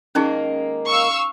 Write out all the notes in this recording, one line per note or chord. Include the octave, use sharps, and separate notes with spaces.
D#3 G#3 A#3 C#4 D#4 G#4
F5 C#6 E6